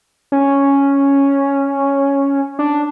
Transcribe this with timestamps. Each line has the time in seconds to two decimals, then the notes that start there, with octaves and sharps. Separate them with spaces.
0.32 C#4
2.59 D4